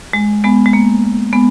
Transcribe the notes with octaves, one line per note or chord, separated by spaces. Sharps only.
G#3
G#3 B3
G#3
A#3
G#3 B3